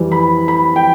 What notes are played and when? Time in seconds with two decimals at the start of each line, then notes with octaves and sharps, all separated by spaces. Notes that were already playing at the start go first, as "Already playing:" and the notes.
Already playing: F2 E3 G3
0.12 B5
0.48 B5
0.76 G5